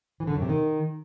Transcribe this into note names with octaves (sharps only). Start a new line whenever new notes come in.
E3
D3
F#2
C3
D#3